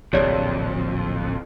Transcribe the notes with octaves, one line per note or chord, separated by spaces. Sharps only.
D1 A#1 F2 C3 G4 C#5 D5